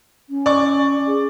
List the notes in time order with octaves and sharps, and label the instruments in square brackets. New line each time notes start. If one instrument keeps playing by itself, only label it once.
[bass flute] C#4
[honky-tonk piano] D5 C#6
[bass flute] G#4